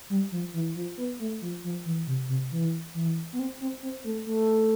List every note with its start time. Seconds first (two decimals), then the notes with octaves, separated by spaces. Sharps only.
0.10 G3
0.32 F3
0.54 E3
0.75 F3
0.98 B3
1.20 A3
1.42 F3
1.64 F3
1.85 E3
2.07 C3
2.29 C3
2.52 E3
2.94 E3
3.33 B3
3.39 C4
3.61 C4
3.83 C4
4.04 A3
4.26 A3